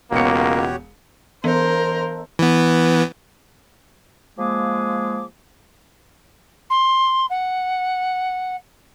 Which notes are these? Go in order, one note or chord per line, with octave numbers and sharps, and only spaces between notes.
E1 C#2 A#3 B3 F#4 G4 C#5 C#7
E3 B3 A#4 C5
E3 B3
F3 G#3 A#3 G#4 D6
C6
F#5